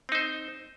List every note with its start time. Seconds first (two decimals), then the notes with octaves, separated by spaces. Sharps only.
0.09 C4
0.12 D#4
0.15 C5